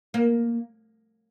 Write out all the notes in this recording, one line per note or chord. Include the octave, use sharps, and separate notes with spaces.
A#3